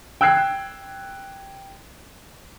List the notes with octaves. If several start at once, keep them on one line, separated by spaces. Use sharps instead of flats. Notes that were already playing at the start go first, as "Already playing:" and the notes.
G5 E6 F#6 G#6 C7